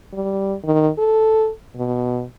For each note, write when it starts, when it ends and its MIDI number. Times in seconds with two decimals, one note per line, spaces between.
0.13 0.54 55
0.64 0.89 51
0.98 1.50 69
1.76 2.24 47